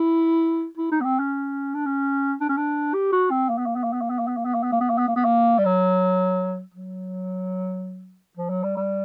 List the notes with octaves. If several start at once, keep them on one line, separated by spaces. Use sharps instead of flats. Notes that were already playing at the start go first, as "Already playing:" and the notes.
Already playing: E4
E4
D#4
B3
C4
C#4
D4
C#4
D4
C#4
D4
G4
F#4
C4
A#3
B3
A#3
B3
A#3
B3
A#3
B3
A#3
B3
A#3
B3
A#3
B3
A#3
B3
A#3
B3
A#3
B3
A#3
G3
F#3
F#3
F3
F#3
G3
G3